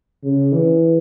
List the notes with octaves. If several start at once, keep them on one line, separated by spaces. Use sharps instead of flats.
C#3
E3